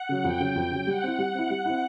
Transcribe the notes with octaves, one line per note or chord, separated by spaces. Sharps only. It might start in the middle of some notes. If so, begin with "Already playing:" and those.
Already playing: F#5
C#3 F#3
F2 G5
C#3 F#3
F2
C#3 F#3
G3 F#5
C4 E4
G3
C4 E4
G3
C4 E4